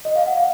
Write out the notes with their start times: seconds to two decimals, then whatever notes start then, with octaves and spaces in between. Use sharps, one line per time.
0.05 D#5
0.16 F5
0.26 F#5
0.37 F5